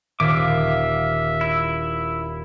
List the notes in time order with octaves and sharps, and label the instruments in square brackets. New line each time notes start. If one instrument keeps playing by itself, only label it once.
[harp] D#1 [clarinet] E5 [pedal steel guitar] F5 D6
[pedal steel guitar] E4